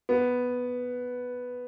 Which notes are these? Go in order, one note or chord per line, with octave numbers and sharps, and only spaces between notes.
B3